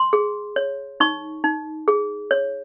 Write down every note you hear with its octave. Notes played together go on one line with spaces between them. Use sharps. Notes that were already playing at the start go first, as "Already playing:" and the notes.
Already playing: C6
G#4
C#5
D#4 C#6
D#4
G#4
C#5